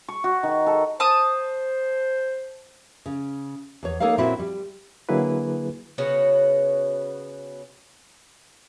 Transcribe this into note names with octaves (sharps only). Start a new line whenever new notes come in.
C#6
F#4
D#3
A4
C5 A5 D#6
C#3
E2 C#5
A#3 D#4 A4 A#4 C#5 F5
A#2 C4 C#4 E4 F#4
G3
D3 F#3 A#3 E4 G#4 B4
C#3 B3 F#4 C#5